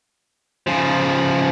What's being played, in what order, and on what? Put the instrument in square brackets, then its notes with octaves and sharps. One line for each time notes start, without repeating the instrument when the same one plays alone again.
[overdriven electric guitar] C#3 F3